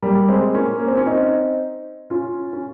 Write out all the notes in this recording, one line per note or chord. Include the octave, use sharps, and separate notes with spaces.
G3 A#3
G#3 C4
A#3 C#4
A#3
C4
C#4
C4 D#4
C#4 F4
C#4